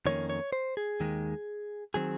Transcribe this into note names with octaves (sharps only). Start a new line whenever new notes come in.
F2 D#3 A#3 C#4 C#5
C#5
C5
G#4
D#2 D#3 G#3
D#3 F#3 C4 G#4